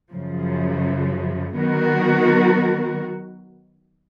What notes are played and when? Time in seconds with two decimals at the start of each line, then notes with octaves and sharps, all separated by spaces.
0.11 F#2 C#3 F3
1.55 D#3 F#3 B3 F#4 A#4